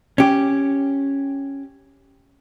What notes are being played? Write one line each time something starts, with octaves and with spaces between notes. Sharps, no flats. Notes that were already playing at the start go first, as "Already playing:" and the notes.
C#4 G4